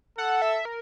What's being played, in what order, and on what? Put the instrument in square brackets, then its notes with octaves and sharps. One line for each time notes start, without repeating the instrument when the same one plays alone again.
[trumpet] A4 [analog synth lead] F#5
[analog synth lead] E5
A#4